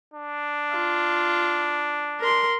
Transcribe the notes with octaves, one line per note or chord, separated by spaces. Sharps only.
D4
F4
A#4 C6